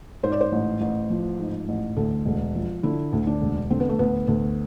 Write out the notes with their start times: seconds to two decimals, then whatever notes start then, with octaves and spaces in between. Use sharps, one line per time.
0.23 G#2 C5
0.32 D5
0.41 C5
0.52 A1
0.81 A1
1.10 F3
1.39 G#2
1.68 A1
1.97 D2 A4
2.25 E1
2.55 F3
2.83 D3 E4
3.13 D2
3.27 D4
3.41 E1
3.70 D3 C4
3.80 B3
3.89 A3
3.99 D2 B3
4.28 D2